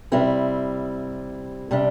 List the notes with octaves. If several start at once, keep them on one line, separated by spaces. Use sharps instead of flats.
C3 G3 C4 E4
C3 G3 D4